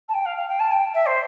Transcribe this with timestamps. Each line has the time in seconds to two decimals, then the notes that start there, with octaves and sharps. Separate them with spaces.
0.09 A5
0.14 G5
0.26 F5
0.37 F5
0.48 G5
0.60 A5
0.72 G5
0.94 E5
1.06 C5